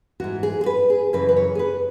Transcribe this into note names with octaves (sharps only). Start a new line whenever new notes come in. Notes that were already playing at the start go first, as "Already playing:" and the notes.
G#2 E3 F#4
G#4
G#4
B4
G#4
F#2 C#3 E3 B4
B4
C#5
G#4
B4